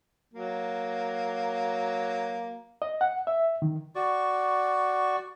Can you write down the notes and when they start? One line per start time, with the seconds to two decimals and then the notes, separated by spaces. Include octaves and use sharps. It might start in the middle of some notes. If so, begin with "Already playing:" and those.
0.34 F#3 A#3
2.82 D#5
3.01 F#5
3.27 E5
3.62 D#3
3.95 F#4 D5 C#6